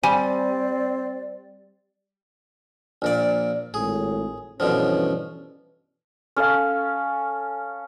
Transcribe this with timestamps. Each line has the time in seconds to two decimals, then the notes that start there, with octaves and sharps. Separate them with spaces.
0.04 G3 C4 D5 G#5
3.02 A#1 A#2 D5
3.74 G#1 A2 G#4
4.60 G2 B2 D3 E3 F3 C#4
6.36 C#4 A4 F5